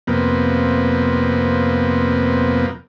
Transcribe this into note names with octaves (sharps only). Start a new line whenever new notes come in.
F2 C3 A#3 B3